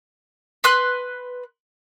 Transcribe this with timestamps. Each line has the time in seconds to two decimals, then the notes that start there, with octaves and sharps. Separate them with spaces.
0.64 B4 C6 F#6